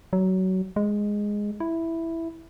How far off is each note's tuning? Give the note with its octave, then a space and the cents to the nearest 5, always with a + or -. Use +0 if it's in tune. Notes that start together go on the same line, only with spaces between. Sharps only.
F#3 +20
G#3 -5
E4 +0